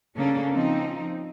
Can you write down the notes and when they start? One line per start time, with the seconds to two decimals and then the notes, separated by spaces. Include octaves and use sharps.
0.16 C#3 A#3 C#4 D4 A4
0.53 F3 C4 D#4